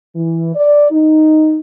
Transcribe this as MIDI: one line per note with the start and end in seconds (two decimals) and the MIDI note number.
0.15 0.53 52
0.55 0.91 74
0.91 1.59 63